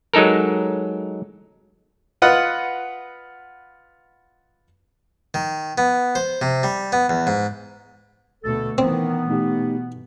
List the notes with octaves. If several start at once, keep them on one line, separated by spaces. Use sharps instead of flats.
F#3 G#3 D#4 A4 A#4
F4 B4 D#5 F#5
D#3
B3
C5
C3
G3
B3
E2
G#2
D2 B2 A3 A4
D#3 E3 B3 C4
B2 A3 D#4 G4